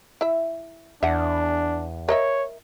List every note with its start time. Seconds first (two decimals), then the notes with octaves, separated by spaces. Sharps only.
0.21 E4 E5
1.03 E2 D4 E5 F#5
2.09 A#4 C#5 D#5 E5